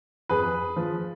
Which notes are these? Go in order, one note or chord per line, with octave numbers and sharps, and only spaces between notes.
F2 G#4 B4
F3